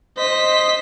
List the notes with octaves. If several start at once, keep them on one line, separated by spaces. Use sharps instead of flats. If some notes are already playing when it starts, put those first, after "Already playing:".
C5 D#5 B6